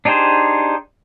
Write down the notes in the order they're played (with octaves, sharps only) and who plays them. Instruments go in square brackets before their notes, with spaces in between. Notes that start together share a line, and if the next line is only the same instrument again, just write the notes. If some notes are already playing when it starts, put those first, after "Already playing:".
[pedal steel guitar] D4 D#4 G4 G#4 C5